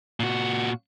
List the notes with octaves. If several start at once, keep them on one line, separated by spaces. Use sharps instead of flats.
A#2 F#4